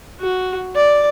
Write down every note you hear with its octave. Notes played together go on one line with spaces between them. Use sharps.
F#4
D5